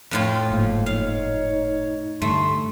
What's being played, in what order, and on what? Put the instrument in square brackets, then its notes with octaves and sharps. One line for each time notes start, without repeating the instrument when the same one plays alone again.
[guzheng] F2 A2 F4
[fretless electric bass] F#1 G#2 [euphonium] F3 [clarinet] A#3
[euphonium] D#4 [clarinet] C#5 [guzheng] F5
[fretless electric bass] G2 D3 [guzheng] A3 [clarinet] C6